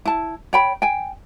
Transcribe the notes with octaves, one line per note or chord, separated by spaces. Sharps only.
E4 A5
C#5 G5 B5
G5 G#5